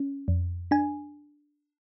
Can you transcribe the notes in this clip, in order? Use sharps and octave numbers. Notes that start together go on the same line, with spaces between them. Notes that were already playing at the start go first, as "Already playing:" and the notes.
Already playing: C#4
F2
D4 G#5